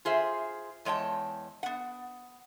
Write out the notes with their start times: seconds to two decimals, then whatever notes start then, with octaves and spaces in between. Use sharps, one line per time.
0.05 F4 G#4 C5 E5
0.85 E2 G#3 C#5 G5 A5
1.63 B3 F#5